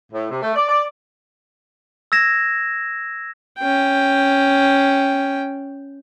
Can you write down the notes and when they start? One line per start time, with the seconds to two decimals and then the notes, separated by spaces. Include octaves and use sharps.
0.13 A2
0.30 C3
0.42 A3
0.55 D5
0.68 D5
2.12 E6 G#6 A#6 E7
3.59 C#4 G5